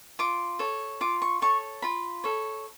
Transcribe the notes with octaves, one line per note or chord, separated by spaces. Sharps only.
F4 D6
A4 C#5
F4 D6
C#6
A4 C#5 C#6
F4 B5
A4 C#5